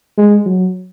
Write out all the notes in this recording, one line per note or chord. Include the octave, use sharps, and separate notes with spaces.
G#3
F#3